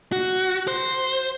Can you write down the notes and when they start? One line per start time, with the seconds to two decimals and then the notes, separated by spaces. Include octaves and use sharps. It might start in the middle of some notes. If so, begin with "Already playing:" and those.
0.12 F#4
0.68 C5